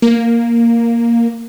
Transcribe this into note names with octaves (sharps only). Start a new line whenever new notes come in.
A#3